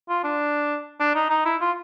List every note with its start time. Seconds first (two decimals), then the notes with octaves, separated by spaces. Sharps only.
0.09 F4
0.24 D4
1.00 D4
1.15 D#4
1.30 D#4
1.45 E4
1.61 F4